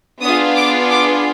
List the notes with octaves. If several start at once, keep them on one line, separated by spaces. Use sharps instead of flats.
B3 D4 F4 G#4 D#6
D6
D6